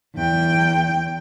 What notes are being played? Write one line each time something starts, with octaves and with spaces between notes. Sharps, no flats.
E2 G5